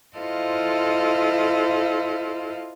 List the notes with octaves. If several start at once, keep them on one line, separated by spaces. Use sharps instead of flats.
E4 F4 A4 C5 D#5 F5